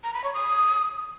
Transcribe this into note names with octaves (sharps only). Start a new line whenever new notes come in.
A#5
B5
C#5
D#6